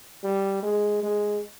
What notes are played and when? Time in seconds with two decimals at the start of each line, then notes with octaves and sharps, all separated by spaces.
0.24 G3
0.63 G#3
1.03 G#3